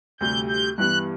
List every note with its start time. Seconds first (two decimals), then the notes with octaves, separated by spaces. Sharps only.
0.20 D2 C3 G3 G6
0.49 G6
0.78 G2 E3 G3 B3 F#6